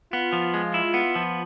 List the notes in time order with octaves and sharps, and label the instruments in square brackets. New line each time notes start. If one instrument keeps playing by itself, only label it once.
[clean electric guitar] B3 [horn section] F4
[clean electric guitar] F3
G#3
E4
B3
F3